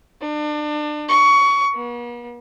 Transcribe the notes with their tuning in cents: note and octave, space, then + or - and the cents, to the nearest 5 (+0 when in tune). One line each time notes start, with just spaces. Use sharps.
D4 +30
C#6 +20
B3 -45